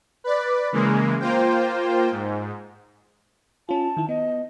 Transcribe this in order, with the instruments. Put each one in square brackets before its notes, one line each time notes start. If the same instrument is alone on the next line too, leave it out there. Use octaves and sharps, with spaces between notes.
[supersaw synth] B4 D5
C#3 E3 G#3 A#3
A#3 F4 C5 G5
G#2
[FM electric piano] C#4 F4 [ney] A5
[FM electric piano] D#3 E4
[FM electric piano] B3 [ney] D#5